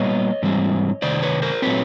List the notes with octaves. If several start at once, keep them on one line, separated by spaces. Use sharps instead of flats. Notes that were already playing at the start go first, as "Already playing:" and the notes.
Already playing: A#2 G3 B3 C#5 D#5
G#2 E3 G3 C4
C3 D#3 C5 D5
B4 C#5
A#4 C5
A#2 F#3 A3 C4 B4 C#5